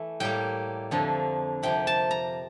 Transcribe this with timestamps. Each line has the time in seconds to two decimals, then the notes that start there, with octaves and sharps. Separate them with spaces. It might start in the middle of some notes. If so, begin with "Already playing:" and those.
Already playing: E3 A3
0.20 A2 G3 A#3 G5
0.91 F2 D3 F3 A#3
1.63 C3 F3 A#3 G5
1.87 A5
2.11 A#5